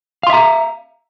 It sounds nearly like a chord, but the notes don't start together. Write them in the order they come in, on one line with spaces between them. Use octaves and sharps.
F5 C6 E5 A#5